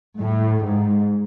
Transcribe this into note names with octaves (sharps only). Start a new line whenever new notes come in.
A2
G#2